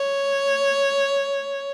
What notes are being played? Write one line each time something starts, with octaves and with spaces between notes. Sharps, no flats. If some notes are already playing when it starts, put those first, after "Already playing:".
Already playing: C#5